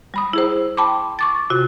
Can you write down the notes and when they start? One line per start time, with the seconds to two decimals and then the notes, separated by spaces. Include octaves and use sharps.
0.14 G3 B5 D#6
0.33 E4 G#4 C5
0.77 G5 A5 B5 C6 D6
1.19 C#6 D6 A6
1.50 C3 F4 F#4